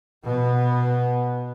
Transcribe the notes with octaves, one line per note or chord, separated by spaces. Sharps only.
B2 B3